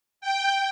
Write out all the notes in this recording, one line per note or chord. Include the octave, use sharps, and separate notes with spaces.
G5